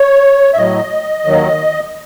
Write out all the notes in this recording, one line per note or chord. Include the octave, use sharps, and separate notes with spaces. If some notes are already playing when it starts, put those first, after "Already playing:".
Already playing: C#5
E5
A2 F#3 D#5
D#2 D#3 F#3